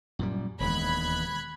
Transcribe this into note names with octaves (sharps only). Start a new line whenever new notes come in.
F#2 A#2 G3
E1 D#2 G#3 B5 F#6 G#6